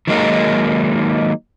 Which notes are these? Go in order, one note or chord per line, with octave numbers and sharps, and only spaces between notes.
D#3 F#3 G#3 A#3 D#4